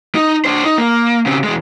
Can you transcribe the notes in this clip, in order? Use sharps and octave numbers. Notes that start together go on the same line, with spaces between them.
D#4
D4 C5
D#4
A#3
C#3 C4
E2 G#3